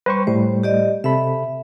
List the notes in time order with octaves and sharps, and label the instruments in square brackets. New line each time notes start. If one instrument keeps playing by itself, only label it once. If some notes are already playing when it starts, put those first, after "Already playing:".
[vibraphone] G3 [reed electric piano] B4 C5 C#6
[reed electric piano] A2 G3 A3 [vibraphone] C5
[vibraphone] G4 D5 D#5
[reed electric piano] C3 A4 B5 [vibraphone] E5